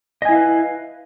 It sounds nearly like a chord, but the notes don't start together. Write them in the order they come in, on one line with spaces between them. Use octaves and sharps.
D#5 G#5 E4 F5 B4